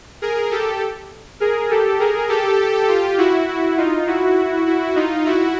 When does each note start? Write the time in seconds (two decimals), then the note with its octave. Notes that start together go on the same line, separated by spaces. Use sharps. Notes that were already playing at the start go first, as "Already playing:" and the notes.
0.22 G#4 A#4
0.51 G4 A4
1.40 G#4 A#4
1.70 G4 A4
2.00 G#4 A#4
2.29 G4 A4
2.88 F4 G4
3.18 E4 F#4
3.47 E4 F#4
3.77 D#4 F4
4.07 E4 F#4
4.66 E4 F#4
4.96 D#4 F4
5.25 E4 F#4